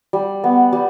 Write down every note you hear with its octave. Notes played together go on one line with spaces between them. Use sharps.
G3
B3
G3